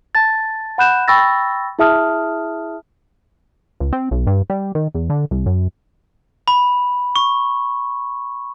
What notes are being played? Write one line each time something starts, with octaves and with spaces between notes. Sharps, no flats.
A5 A6
F#5 B5 F#6 G6 E7
G5 B5 C#6 E6 A6 A#6
E4 G#4 E5 A5 D#6 F6
C#2
C4
B1
G2
G3
D#3
E2
D3
C2
F#2
B5
C#6